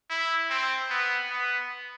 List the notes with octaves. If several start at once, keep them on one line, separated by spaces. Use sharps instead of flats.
E4
C4
B3
B3